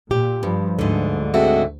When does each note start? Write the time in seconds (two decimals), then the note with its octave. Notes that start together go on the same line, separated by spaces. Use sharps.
0.11 A#2 G4
0.43 G2 F3 G3
0.79 D2 G#2 D3
1.34 G#3 A3 C4 F#4